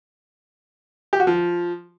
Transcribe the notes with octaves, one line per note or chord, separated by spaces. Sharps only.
G4
F#4
F3